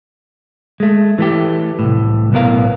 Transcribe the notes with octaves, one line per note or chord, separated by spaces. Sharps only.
G#3 A3
E3 A3 G4
C2 A2
B1 A2 B3 A#4 F5